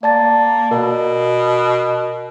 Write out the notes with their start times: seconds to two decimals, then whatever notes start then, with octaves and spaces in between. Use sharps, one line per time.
0.03 A#3 D5 A5 A6
0.71 B2 A#4